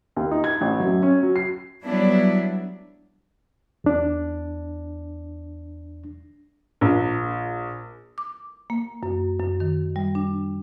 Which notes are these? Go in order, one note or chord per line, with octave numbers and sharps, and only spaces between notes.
D#2
D#4
G#6
A1
F#2
C#4
F#3
C7
F#3 G3 B3 D4 E4
E2 D4
A#1
D6
A#3
F#2
F#2
D#3
G3
D4